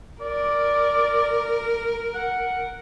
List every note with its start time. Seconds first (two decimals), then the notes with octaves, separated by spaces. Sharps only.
0.21 A#4 D5
2.15 F#5